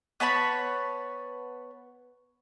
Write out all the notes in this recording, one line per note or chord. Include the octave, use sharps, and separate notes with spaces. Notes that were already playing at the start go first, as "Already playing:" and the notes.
B3 C#5 A5 B5